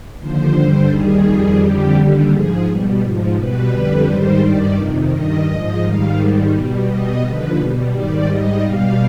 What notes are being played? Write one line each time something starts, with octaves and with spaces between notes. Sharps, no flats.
D#2 D3 F3 C5
G2 D3 G3 C5
D#2 D#3 G3 G#4
F2 D#3 G3 G#4
F2 D3 G3 G4
D#2 D3 G3
G#2 F3 G#4
B2 G3
G#2 F3
B2 G3 B4
F2 D3 G3 B4
G#2 D#3 G3 C5
G2 D#3 G3 D5
F2 C3 D#3
G2 D#3 G3 D#5
G#2 F3 D#5
G#2 D#3 G3 F5
G#2 D#3 G3
B2 G3
B2 G3 D#5
D#2 D3 F3 B4
B2 G3
G#2 D#3 G3 D5
G#2 G3 D#5
B2 G3 F5